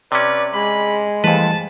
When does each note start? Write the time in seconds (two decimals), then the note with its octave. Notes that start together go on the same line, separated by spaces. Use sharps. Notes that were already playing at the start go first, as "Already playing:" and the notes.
0.12 C3 C#4 B4 D5
0.54 G#3 B5
1.24 F2 E3 G3 A3 B4 A5